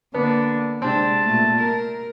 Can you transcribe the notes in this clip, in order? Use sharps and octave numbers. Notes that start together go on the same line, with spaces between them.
D3 A#3 B3 D4
C3 G#3 C4 D4 A5
A#2 A3
A#4